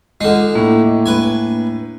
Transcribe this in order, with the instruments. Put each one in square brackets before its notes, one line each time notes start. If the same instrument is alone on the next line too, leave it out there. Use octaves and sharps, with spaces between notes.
[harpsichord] D3 D#4 [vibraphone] G#3 F4
[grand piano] A2 [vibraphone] A#3 D4
[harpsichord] B4 G#5